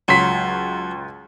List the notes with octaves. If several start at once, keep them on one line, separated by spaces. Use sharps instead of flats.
C#2 F#3 C6 B6